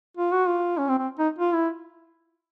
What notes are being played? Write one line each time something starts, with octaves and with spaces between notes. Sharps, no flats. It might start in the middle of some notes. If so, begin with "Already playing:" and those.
F4
F#4
F4
C#4
C4
C4
D#4
F4
E4